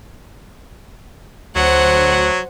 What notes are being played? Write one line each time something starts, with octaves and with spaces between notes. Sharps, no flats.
D2 F#3 C5 F#5